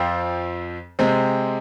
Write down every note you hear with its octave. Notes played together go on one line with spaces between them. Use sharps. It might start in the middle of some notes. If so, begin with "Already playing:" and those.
Already playing: F2 F3 C4 F4 C5
C3 G#3 C4